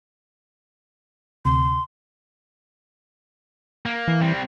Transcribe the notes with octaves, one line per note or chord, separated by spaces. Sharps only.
D2 C3 C6
A#3
E3
G3 C4